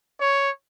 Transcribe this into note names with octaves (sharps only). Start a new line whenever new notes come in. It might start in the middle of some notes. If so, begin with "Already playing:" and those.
C#5